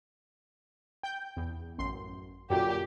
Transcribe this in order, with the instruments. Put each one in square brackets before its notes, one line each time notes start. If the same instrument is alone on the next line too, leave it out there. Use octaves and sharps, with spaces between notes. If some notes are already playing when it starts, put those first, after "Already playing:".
[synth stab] G5 G6
E2
A1 F#2 C6
[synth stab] F#2 A#2 D3 [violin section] G4